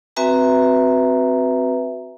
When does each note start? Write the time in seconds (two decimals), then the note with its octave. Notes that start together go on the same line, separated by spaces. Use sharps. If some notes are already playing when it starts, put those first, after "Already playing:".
0.16 C4 F#4 B4 E5 G#5 A#5